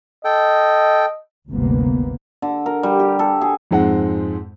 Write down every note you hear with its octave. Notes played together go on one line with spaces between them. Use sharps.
A4 D#5 G5
G1 D2 C3 A#3 B3
D3
A#4
G3
G4
A4
G#4
F2 G#2 G#3 C4 F#5